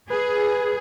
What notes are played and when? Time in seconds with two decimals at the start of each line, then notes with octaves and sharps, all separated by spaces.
0.11 G#4 B4